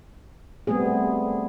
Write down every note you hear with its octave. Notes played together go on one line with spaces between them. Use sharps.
G3 A3 B3 C4 G#4